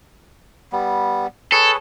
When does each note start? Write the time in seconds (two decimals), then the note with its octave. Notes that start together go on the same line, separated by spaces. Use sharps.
0.73 G3 B3
1.52 G#4 A4 B4 C#5